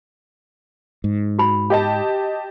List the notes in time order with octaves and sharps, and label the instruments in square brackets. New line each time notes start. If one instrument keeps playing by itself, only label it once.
[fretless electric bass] G#2
[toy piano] F#4 B5
[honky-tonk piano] G4 D#5 A5